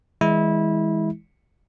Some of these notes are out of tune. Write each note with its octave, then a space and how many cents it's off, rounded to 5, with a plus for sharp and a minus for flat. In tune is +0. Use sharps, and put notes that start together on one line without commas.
E3 -25 G#3 -5 E4 -20